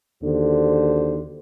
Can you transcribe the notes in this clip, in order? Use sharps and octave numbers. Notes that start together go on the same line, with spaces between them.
D#2 D3 F#4 C5